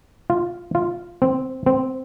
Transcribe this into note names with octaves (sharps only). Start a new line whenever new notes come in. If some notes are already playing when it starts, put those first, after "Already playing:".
F4
F4
C4
C4